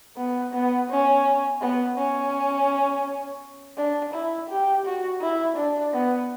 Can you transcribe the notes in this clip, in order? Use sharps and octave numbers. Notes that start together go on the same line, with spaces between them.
B3
B3
C#4
B3
C#4
D4
E4
G4
F#4
E4
D4
B3